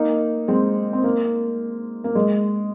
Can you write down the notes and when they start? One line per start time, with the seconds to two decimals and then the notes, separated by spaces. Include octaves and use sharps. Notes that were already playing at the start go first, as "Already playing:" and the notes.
Already playing: A#3 D#4
0.48 G#3 C4
0.93 C4
1.04 A#3
2.04 A#3
2.15 G#3